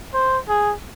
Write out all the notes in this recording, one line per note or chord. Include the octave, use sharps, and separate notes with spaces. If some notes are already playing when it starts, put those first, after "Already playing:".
C5
G#4